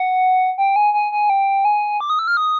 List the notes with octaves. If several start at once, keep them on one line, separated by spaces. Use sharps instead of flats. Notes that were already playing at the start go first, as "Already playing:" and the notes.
Already playing: F#5
G5
G#5
G#5
G#5
G5
G#5
D6
D#6
E6
F6
D#6